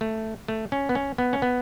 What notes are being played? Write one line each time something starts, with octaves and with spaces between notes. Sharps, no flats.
A3
A3
C#4
B3
C#4
B3
C#4
B3